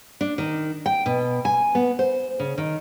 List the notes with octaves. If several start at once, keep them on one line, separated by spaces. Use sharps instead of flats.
D4
D#3
G5
B2
G#5
B3
C5
C#3
D#3